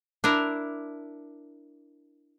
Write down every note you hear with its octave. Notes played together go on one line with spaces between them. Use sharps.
D4 E4 A#4